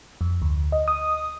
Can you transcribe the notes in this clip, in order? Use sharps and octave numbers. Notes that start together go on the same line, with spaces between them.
F2
D2
D#5
D#6